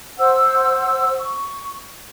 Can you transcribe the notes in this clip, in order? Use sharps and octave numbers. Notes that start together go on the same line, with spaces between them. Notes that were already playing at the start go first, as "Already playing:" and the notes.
C5 F#5 E6
C#6